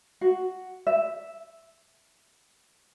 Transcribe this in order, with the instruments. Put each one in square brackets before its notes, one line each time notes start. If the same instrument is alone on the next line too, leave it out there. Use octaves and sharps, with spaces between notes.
[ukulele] F#4
E5